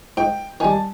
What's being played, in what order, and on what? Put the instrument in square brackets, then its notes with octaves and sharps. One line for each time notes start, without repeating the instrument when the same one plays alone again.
[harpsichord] G#2 [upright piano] G5
[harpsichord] D#3 G3 [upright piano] G#5
[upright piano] A5